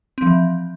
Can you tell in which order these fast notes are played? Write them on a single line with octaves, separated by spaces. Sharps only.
C4 F3 E3